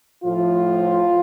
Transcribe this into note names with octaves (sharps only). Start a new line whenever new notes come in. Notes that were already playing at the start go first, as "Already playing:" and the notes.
A2 F3 F4